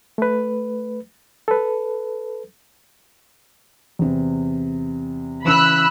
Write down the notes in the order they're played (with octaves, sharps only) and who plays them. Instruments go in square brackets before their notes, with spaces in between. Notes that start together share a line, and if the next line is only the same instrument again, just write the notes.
[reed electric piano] A3 B4
A4 B4
[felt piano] E2 C3
[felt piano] C#3 E3 [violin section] B5 E6 F#6